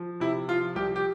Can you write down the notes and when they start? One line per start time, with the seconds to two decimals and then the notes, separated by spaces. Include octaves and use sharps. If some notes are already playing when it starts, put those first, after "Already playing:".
Already playing: F3
0.20 C3 E4
0.48 F3 F4
0.75 C2 G4
0.96 G4